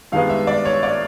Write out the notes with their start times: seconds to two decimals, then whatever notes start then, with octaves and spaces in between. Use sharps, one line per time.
0.12 G2 D#3 G#3 B3 F5
0.30 E5
0.47 D5
0.65 C#5
0.83 D5